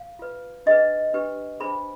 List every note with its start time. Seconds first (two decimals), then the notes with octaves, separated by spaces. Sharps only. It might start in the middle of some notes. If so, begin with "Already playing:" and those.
Already playing: F5
0.19 F4 B4
0.66 D4 G#4 B4 D#5
1.14 D4 G4 B4
1.60 D4 G#4 C5 B5